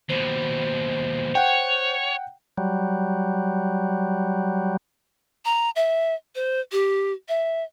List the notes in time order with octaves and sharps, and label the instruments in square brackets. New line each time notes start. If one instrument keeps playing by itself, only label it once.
[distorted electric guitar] D#2 B2 [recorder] C5
[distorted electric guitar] C#5 [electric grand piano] F#5 G5
[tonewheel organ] F#3 G3
[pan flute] A#5
E5
C5
G4
E5